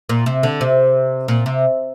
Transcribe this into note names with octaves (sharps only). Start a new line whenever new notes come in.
A#2
C3
D3
C3
A#2
C3